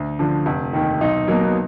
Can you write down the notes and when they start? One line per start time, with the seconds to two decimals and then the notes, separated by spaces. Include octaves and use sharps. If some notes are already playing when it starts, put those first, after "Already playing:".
Already playing: D2
0.19 D3 F3
0.46 F1
0.73 D#2 D#3
1.01 B1 D#4
1.28 B2 F#3 A#3
1.41 B3